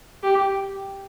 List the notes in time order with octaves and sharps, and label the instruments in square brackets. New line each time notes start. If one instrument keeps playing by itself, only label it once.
[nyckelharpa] G4